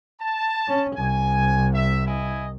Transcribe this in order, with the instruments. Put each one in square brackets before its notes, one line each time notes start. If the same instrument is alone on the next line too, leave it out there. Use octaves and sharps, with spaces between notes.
[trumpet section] A5
[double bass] C#4
[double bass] C2 [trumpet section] G#5
[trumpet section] E5
E4 D#5 G#5